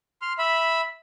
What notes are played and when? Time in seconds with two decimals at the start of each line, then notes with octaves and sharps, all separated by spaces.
0.22 C6 F6
0.39 E5 B5